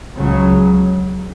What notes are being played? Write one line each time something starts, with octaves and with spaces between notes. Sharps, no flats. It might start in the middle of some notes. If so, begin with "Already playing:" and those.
C#2 C#3 F#3